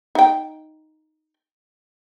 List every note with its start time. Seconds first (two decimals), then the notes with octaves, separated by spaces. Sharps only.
0.15 D#4 G5